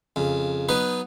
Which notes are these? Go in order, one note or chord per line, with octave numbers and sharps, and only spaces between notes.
F2 C#3
F#3 B3 D#4 B4